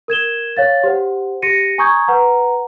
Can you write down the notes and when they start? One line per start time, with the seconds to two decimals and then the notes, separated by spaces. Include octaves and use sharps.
0.08 A#4 G#6 E7 G7
0.57 C#5 F5 A6
0.83 G4 C5 F#5
1.42 G4 A#6 C#7 D#7
1.78 G#5 A#5 C#6 D#6 G6 G#6
2.08 B4 F#5 A#5